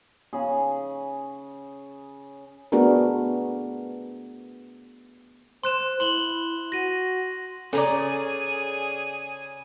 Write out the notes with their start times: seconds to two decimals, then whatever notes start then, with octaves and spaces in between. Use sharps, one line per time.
0.33 C#3 G#4
2.72 A3 B3 D4 F#4 G#4 A#4
5.64 C5 C6 F#6 E7
6.00 E4 C6 F#7 G7
6.72 F#4 A#6 D#7
7.73 C#3 C#4 G#4 A4 D5 G#5 A#5